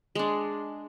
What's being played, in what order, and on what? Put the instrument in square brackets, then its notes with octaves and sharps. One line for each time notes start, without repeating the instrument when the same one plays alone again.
[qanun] G#3 D4